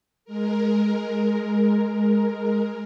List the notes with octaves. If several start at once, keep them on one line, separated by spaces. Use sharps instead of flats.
G#3 A#4